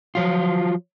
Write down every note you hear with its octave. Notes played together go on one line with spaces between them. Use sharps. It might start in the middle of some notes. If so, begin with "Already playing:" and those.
F3 F#3 F4